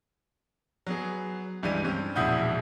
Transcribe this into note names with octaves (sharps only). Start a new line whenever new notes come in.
F#3 B3 G#4
C#2 G2 E3 G3 D#7
G2 C4 C#4
E1 A#1 E4 F#5 D#6 G6